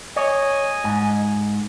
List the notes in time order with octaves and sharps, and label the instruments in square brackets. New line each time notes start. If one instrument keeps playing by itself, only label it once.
[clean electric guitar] C#5 [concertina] D#5 G#5
[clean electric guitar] G#2